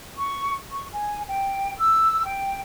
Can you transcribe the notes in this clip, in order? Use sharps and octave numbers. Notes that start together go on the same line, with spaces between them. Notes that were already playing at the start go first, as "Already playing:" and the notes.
C#6
C#6
G#5
G5
E6
G5